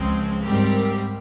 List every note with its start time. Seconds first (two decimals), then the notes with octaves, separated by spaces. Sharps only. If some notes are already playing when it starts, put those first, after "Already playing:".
Already playing: C#2 C#3 F3 G#3 C4
0.44 G#2 G3 C4 G4 A#4